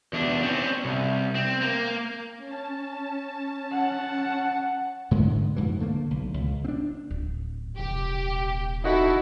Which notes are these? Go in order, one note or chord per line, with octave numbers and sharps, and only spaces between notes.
E2 D4
C4 C#4
C2
C4
A#3
C#4 A5
F#5
G#2 D3 G#3 A3
F2 G#2 B2 E3
D3 A3 A#3
B1
C#2
C4 D4
D1
D#1 C3 E3 G4
D#4 E4 F#4 A4